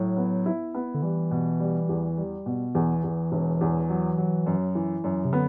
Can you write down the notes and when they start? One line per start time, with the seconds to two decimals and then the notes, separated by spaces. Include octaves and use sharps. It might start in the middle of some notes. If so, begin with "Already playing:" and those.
Already playing: A2 F#3
0.17 B3
0.46 E4
0.74 B3
0.94 D3
1.02 E3 G3
1.31 B2
1.60 G3
1.89 E2
2.18 G3
2.46 B2
2.75 E2 E3
3.04 E2
3.32 E1
3.61 E2
3.89 F#3
4.18 F#3
4.47 F#2
4.75 E3
5.04 F#2
5.25 C3
5.33 D3 B3